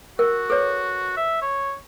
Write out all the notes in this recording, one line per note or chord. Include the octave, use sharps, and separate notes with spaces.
F#4 A#4
A4 B4 C#5
E5
C#5